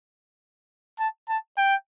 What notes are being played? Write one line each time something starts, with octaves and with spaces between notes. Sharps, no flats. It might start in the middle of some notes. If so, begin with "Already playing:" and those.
A5
A5
G5